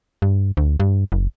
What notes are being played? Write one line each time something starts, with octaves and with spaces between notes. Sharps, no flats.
G2
D2
G2
F#1